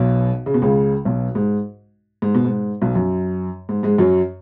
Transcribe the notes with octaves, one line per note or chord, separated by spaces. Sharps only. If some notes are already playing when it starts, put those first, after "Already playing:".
Already playing: B1 B2
C#3
B2
C#2 C#3
B1 B2
G#2
G#2
B2
G#2
B1 B2
F#2
G#2
G#2 G#3
F#2 F#3